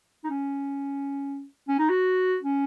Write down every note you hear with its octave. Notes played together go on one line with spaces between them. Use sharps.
D#4
C#4
C#4
D#4
F#4
C#4